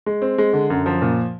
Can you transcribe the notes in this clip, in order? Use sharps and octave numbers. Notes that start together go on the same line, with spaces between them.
G#3
C4
G#3
D3
F#2
F3
A#2